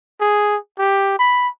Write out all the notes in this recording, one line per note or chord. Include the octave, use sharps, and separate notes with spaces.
G#4
G4
B5